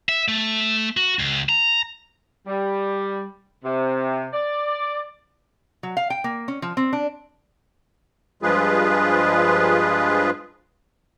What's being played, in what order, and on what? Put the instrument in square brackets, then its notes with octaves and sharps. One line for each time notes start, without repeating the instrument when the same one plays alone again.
[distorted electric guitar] E5
A3
F#4
C#2
A#5
[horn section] G3
C3
D5
[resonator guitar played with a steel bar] F#3
F5
G5
A#3
C#4
F3
C4
D4
[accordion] G2 F3 G#3 F4 G#4 B4